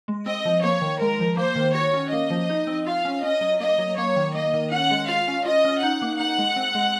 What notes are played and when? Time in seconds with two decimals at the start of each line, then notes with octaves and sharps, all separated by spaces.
0.08 G#3
0.26 C4 D#5
0.45 F3
0.63 A#3 C#5
0.81 D#3
1.01 G#3 A#4
1.20 F3
1.37 A#3 C5
1.56 D#3
1.75 F#4 C#5
1.94 C#4
2.12 A#3 D#5
2.30 F3
2.49 D#4
2.67 C4
2.86 F4 F5
3.05 C#4
3.23 C#4 D#5
3.41 F#3
3.60 A#3 D#5
3.78 F#3
3.97 A#3 C#5
4.16 D#3
4.34 A#3 D#5
4.53 D#3
4.71 C#4 F#5
4.91 G#3
5.08 F4 F5
5.28 C#4
5.45 F4 D#5
5.65 C#4
5.82 D#4 F#5
6.02 A#3
6.20 D#4 F#5
6.38 G#3
6.56 C4
6.75 G#3